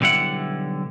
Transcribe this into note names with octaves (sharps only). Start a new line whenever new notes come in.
B1 D3 G3 E4 F#5